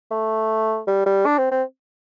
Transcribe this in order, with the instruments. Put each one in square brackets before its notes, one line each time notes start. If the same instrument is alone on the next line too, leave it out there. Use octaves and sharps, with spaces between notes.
[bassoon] A3
G3
G3
D4
C4
C4